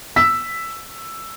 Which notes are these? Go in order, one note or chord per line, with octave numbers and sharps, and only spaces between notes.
E6 B6